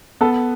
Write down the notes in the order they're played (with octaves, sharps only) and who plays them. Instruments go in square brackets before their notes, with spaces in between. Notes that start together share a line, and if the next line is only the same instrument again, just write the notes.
[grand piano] B3 A4